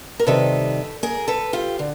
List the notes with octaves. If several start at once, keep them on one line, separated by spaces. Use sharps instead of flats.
A#4
C3 D#3 G3 A4 B4
G#4 A#4
A4 B4
F4 G4
D3